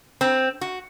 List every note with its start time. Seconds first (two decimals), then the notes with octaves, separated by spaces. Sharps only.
0.21 C4
0.61 F#4